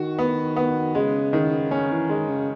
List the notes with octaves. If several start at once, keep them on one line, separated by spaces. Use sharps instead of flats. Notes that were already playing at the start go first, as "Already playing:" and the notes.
Already playing: D#3 F#4
B3
B3
C#3 G#3
D#3
C#3 C#4
E3
D#3 G#3
C#3